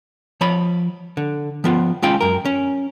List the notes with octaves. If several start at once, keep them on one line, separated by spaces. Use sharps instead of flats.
F3 C#5 B5
D3
F3 B3 F4
G#3 C#4 F4 F5 G5
F#2 A#4
C#4